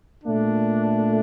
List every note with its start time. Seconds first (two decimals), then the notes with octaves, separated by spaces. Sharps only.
0.24 A#2 A3 D4